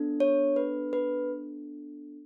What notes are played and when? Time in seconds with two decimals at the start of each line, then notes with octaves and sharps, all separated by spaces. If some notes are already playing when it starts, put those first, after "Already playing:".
Already playing: B3 D4 A4
0.20 C#5
0.56 B4
0.93 B4